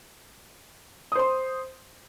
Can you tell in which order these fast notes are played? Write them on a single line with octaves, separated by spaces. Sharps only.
D#6 C5 C6